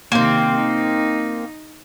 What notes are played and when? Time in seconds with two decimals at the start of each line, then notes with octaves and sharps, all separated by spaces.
0.12 C3 D#3 A#3 C4
0.56 D#4